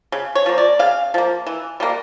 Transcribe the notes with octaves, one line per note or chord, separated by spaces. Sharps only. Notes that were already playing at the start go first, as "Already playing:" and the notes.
C#3
C#5
F3 A#3
D5
C#3 F5
F3 A#3
E3
G3 A#3